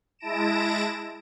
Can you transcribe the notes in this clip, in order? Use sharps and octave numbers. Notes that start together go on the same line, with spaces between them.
G#3 E4 A5 A#6 D7 E7